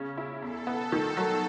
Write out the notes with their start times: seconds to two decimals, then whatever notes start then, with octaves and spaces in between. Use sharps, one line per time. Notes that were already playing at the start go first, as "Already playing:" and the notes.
Already playing: C#3 C#4
0.17 E4
0.42 E2 A4
0.67 B3
0.92 D#3
1.17 F#3